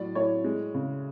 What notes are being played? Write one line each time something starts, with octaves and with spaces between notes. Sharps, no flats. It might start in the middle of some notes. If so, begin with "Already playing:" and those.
Already playing: A2 F#3 D5
A2 C#5
G#3
C#3